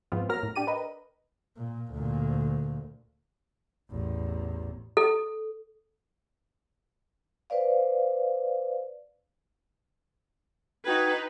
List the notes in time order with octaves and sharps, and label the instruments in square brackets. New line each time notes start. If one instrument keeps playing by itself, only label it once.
[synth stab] G#2 F3 B3 C4 F4
F#3 A#3 A#4 F6 A#6
A2
D4 G4 D5 D#7
A#4 B4 D#5
[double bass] A#2
D2 A#2
A1 E2
[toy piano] A4
[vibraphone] B4 C5 D5 F5
[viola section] D#4 B4 [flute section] F#4 G5 G#6